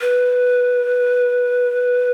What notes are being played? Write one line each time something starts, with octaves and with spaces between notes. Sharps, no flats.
B4